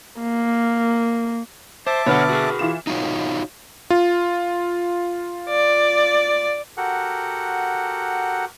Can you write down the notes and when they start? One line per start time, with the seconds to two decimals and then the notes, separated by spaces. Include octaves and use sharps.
0.20 A#3
1.87 C5 E5 A5 D6
2.06 B2 D3 B4 C#5 F#5 F6
2.29 F#4 G#4
2.59 E3 F4 E7
2.87 D#4 F4 F#4 C#5
3.90 F4
5.50 D5
6.77 F#4 G4 A4 A#4 F#5